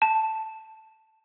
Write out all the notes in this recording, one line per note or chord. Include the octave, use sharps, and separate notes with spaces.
A5